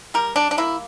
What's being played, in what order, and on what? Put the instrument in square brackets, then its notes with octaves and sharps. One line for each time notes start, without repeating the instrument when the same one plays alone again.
[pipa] G3 A#4
D4
D4
A#3 E4